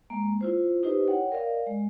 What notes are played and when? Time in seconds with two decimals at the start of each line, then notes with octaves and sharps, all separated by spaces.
0.10 G#3 A#3
0.41 E4 F4 C5
0.83 D#4 E4 G4 B4 C5 D#5
1.07 C#5 F#5 G5
1.32 A#4 D5 D#5 F5
1.67 G#3